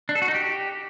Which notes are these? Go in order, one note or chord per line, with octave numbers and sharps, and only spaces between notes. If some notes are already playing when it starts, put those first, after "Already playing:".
D4
A4
F#4
D#4
G4